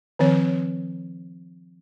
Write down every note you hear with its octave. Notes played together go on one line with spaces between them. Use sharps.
D#3 F3 C4 C#5